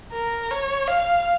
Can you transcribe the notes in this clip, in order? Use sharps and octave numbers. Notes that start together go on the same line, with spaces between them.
A#4
C#5
F5